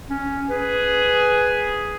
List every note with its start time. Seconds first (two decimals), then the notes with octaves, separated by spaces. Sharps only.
0.10 C#4
0.50 G#4 B4